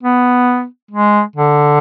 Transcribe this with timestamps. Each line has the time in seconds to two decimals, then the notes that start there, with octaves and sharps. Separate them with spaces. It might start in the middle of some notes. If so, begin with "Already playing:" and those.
0.03 B3
0.91 G#3
1.36 D3